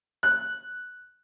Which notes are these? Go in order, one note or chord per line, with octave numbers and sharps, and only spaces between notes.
F#6